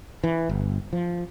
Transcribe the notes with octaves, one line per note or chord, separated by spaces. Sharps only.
E3
G1
F3